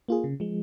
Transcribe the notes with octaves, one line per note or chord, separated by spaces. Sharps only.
A#3 F4 G#4
C#3
F3 G#3